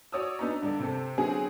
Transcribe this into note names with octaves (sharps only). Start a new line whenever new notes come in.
F#4 C#5 D5 D#6 E6
B3 D4 D#4 F#4 A#5
G2 D3 D5
C3 C4 A4
D3 F#3 B3 C4 G#4